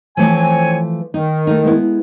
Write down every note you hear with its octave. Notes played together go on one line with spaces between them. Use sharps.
E3 F3 A3 C4 C#5 G#5
D#3 D#4
A3 D#4
G#3 B3 E4